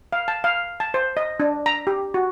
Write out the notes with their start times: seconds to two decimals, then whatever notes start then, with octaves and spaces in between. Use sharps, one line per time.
0.13 F5
0.28 A5
0.44 F5
0.80 A5
0.94 C5
1.17 D#5
1.40 D4
1.66 A#5
1.87 G4
2.14 F#4